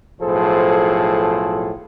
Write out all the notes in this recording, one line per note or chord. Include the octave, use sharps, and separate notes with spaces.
B1 A2 F3 G#4 A4 C5